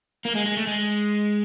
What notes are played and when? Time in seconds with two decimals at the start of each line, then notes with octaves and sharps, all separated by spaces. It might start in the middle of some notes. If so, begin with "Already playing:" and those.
0.25 A#3
0.35 G#3
0.46 G#3
0.57 A3
0.67 G#3